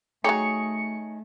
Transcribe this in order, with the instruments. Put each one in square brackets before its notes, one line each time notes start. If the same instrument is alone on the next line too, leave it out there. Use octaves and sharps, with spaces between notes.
[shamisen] F#3 G4 [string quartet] A3 [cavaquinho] D#4 G#4 C#5 [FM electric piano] C#7